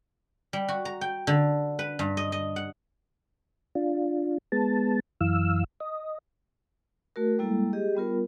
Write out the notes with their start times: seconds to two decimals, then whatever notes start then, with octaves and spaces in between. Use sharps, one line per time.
0.53 G3
0.68 F#4
0.85 A#5
1.01 G5
1.27 D3
1.79 B4
1.99 G2
2.17 D#5
2.32 D#5
2.56 F#5
3.75 D4 F4
4.52 G#3 B3 A5
5.21 F#2 E3 F5 E6
5.80 D#5
7.16 A3 F#4 A#4
7.39 G3 G#3 A#3 E4 A4
7.73 G4 G#4 D#5
7.95 G3 B3 F4 A#4